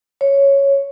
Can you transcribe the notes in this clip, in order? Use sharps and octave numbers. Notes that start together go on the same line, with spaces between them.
C#5